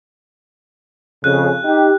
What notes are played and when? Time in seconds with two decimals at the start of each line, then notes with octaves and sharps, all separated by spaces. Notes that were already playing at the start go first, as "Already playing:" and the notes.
1.24 F2 C#3 F#6
1.64 D#4 G4